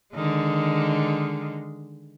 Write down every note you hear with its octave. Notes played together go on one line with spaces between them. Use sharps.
D3 D#3 G#3